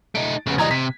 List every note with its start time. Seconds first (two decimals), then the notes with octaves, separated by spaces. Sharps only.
0.15 A3 D#4 D7
0.46 F1 C#3 B3
0.58 E3 G3 D#5 A#5 G#6
0.71 C3 B6